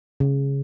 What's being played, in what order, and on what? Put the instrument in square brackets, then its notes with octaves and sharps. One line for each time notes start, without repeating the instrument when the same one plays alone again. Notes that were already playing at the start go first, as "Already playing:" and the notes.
[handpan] C#3